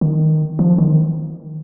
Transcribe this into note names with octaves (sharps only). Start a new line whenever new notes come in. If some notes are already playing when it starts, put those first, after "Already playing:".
D#3
F3
D#3